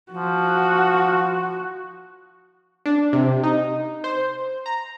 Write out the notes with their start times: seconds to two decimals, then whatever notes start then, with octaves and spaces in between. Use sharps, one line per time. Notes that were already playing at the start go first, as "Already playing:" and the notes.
0.12 F3 F#4
2.86 D4
3.13 C3
3.43 D#4
4.04 C5
4.66 A#5